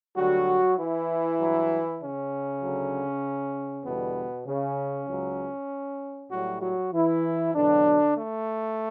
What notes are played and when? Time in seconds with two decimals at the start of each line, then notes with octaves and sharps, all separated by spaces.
0.16 D2 D3 F#3 G3 F#4
0.78 E3 E4
1.40 G2 F#3
2.01 C#3 C#4
2.62 D2 D3 F#3
3.85 E2 B2 D3 G3 B3
4.46 C#3 C#4
5.09 C#2 C#3 F#3
6.31 A2 F#3 G3 F#4
6.62 F#3 F#4
6.92 E3 E4
7.54 E2 B2 D3 F#3 D4
8.17 A3